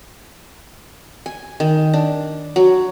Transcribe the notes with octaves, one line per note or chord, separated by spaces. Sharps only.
G#5
D#3
D4
F#3